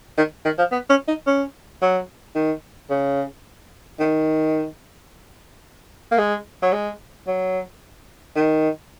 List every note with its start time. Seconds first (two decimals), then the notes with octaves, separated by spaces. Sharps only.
0.18 D#3
0.45 D#3
0.58 F3
0.72 B3
0.90 C#4
1.08 D#4
1.27 C#4
1.82 F#3
2.35 D#3
2.90 C#3
3.99 D#3
6.11 A#3
6.18 G#3
6.62 F#3
6.73 G#3
7.27 F#3
8.36 D#3